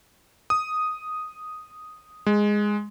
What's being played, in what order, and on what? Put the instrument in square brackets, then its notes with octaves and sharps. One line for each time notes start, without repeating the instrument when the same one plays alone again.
[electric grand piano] D#6
G#3